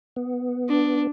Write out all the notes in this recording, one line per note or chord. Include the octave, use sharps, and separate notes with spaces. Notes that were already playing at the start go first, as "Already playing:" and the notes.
B3
D4